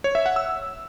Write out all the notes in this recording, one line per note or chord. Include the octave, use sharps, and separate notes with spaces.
C#5
E5
F#5
E6